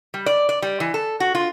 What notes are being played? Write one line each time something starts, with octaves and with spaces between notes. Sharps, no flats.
G3
D5
D5
G3
E3
A4
F#4
F4